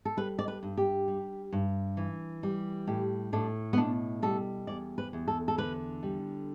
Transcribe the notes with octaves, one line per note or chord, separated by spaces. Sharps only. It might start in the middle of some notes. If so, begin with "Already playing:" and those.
A4
G3 B4
D5
B4
G2
G4
G3
G2
E3
G3
A2 G4
A2 D4
B3
B2 D4
G3 A4
E2 D5
B4
E2
A4
A4
D3 B4
G3